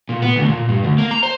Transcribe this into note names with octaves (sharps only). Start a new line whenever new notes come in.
A#2
B3
D2
A#2
G2
D2
A#3
A#5
C5